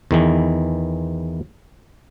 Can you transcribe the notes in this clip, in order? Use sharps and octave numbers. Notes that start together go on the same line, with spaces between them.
E2 D#3 E3